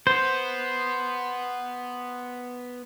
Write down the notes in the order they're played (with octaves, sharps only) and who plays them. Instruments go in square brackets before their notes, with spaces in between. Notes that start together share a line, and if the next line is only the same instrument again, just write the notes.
[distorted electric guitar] B3 [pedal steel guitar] C5